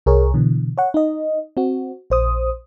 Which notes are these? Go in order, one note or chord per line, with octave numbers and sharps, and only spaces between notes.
C2 G#4 A#4 C#5
B2 D3 E3
C#5 F#5
D#4 D#5
C4 F#4
A#1 C5 D#6